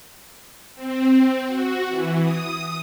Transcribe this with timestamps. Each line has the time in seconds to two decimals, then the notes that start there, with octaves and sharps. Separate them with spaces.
0.75 C4
1.47 F#4
1.88 E3
2.22 D#6